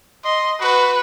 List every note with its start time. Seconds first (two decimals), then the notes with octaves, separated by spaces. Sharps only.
0.25 D#5 C6
0.61 F#4 B4